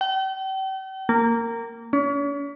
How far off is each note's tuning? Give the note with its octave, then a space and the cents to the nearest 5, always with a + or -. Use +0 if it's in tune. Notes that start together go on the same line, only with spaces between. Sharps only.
G5 -40
A#3 -15
C#4 +40